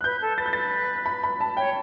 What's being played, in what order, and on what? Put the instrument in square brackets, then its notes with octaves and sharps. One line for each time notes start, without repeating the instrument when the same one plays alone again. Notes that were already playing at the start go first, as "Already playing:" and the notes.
[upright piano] F#6
[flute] B4 [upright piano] G6
[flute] A4
[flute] B4 [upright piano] A6
[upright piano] G6
A6
B5
B5
A5
[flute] C#5 [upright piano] G5